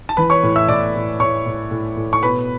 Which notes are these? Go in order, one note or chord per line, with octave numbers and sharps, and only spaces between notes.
A5
E3 B4 B5
C#5 C#6
A2
E5 E6
A2 D5 D6
A2
A2 C#5 C#6
A2
A2
A2
C#6
B2 B4 B5